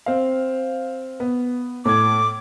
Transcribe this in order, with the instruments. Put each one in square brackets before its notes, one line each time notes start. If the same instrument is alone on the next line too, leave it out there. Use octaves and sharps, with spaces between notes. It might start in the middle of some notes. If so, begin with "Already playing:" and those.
[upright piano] C4 F5
B3
[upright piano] A2 G#6 [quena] D6